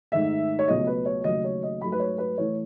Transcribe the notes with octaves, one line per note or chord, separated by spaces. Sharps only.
G#2 D#3 A3 E5
C#5
C#2 B2 F#3 A3 D#5
B4
C#5
D#2 C#3 F#3 A3 D#5
C#5
D#5
G#2 F#3 A3 B5
B4
C#5
B4
A2 E3 A3 C#5